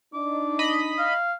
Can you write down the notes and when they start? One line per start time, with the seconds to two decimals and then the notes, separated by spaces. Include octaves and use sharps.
0.14 D4 D#4 D6
0.59 D#5 B5
0.99 F5